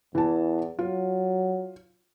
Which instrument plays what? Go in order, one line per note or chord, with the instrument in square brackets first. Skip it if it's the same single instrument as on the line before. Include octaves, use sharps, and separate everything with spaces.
[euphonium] E2 [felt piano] E3 A5
[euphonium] F#3 [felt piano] F4